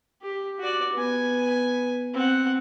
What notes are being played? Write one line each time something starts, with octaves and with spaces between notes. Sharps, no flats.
G4
F#4 D5
B3 G#5
C4 F#5